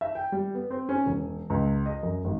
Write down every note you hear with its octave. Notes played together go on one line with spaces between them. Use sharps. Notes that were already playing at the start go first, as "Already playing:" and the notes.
E5
G5
G3
B3
C4
C#4
E1
C#2
D#5
F#2
G#1